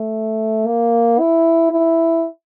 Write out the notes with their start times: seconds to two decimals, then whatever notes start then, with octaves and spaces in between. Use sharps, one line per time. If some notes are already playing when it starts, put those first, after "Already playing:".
Already playing: A3
0.66 A#3
1.19 E4
1.72 E4